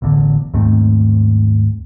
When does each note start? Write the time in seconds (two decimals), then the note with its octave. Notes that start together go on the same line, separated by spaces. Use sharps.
0.02 E1 A1 E2 D3
0.54 D#2 G#2 A3 C4